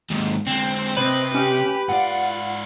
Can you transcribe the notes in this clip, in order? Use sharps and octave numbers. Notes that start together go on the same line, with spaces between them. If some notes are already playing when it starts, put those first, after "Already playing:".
D#2 G#2
D3 G#3 C4
C3 C4 B4 C5 D#5
C#4 G4
G#2 F4 D5 F#5